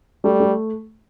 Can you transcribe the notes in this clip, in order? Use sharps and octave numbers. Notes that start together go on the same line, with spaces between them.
G3 A3
A3